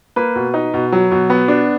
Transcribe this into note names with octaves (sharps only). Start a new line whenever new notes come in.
A#3 B4
B2
D#4
B2
F#3
B2
B3
D4